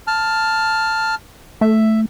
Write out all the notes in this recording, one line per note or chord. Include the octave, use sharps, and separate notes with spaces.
A5 F6
A3 E5